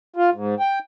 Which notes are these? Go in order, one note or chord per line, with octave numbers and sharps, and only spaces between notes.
F4
G#2
G5